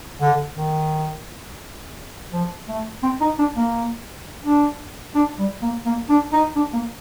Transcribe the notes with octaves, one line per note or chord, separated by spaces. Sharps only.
D3
D#3
F3
A3
C4
D#4
D4
A#3
D4
D4
G3
A#3
A#3
D4
D#4
D4
A#3